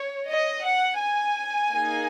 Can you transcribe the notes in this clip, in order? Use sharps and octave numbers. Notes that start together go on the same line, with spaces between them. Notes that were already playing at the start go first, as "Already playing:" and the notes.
Already playing: C#5
D#5
F#5
G#5
A#3 D#4 G#4